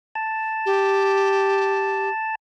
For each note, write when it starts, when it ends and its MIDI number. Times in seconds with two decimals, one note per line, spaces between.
0.15 2.35 81
0.66 2.09 67